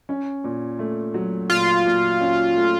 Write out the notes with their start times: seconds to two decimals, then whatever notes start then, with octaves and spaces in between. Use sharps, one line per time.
0.09 C#4
0.44 A#2
0.79 A3
1.14 F#3
1.50 A#2 F4
1.86 A#2
2.21 C#4
2.56 A3